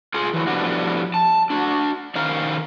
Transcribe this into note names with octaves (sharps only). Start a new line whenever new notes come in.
F4 G#4
E3 F#3
A2 F3 G3 B3 D4 F#4
A5
D4 F#4
D#3 C#4 A#4 C5 F5 A#5